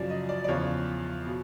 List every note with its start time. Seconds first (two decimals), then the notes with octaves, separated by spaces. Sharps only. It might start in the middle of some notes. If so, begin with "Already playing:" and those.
Already playing: F#2 C#3 F3 D5
0.10 D#5
0.29 D5
0.44 D5
0.48 E2 C#3 F3 C#5
1.26 B2